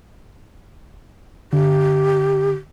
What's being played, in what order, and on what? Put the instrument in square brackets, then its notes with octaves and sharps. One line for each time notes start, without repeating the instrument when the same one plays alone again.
[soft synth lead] D3 [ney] G4